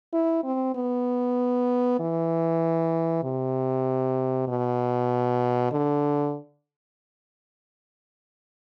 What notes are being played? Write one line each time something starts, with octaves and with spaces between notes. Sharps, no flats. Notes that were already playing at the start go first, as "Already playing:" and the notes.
E4
C4
B3
E3
C3
B2
D3